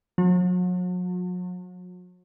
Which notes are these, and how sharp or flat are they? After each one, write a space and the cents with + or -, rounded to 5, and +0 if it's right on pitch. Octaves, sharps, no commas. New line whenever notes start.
F#3 -40